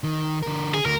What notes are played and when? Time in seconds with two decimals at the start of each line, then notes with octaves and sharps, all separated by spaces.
0.04 D#3
0.42 D3 A#4
0.74 G#4
0.86 D2 A#4